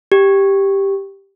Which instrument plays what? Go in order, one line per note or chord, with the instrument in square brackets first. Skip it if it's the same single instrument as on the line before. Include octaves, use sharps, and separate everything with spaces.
[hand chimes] G4